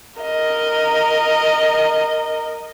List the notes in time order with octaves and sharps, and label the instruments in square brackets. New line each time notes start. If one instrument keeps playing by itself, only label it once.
[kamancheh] A#4 D#5